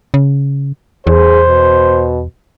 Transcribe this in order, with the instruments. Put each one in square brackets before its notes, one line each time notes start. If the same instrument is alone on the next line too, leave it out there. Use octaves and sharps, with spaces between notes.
[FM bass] C#3
[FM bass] E2 [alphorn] G#4 [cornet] C5
[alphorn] B2